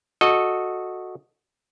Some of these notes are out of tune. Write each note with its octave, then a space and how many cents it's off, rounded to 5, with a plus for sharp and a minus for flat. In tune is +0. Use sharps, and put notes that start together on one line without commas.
F#4 -10 A4 -5 D#5 +0